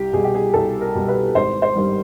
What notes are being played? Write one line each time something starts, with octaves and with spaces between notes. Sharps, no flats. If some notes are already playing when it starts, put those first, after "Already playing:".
Already playing: C2 G4
B2 G3 G#4
G4
G#4
C2 A4
A#4
B2 G3
B4
G#1 C5
C5
G2 D#3 G3